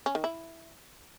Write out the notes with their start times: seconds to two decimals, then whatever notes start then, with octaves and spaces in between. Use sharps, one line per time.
0.06 C#4
0.15 D#3
0.24 E4